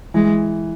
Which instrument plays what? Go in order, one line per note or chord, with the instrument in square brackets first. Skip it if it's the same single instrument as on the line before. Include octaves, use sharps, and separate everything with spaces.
[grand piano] E3 [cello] G#3